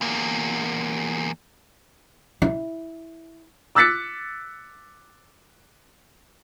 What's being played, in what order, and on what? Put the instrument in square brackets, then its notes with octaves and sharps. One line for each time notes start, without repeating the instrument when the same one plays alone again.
[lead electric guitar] E2 A#3
[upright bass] E4
[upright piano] D6 E6 F#6 A6 B6 C#7